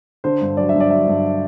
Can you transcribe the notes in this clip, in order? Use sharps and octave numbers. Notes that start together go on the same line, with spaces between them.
D3 C5
G2
F#3 D5
E5
G2
D5
F#3 E5
G2